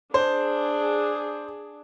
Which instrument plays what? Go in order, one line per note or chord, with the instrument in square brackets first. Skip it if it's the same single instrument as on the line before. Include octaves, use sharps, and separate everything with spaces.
[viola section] D4 G#4 [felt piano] C5